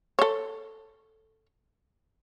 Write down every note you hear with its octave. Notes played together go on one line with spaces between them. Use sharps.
A4 C#5